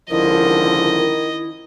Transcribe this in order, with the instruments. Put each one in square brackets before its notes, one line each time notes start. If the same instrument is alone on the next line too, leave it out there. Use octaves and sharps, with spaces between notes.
[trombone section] C#2 D3 F3 [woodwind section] D#3 [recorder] E4 [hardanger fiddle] D#5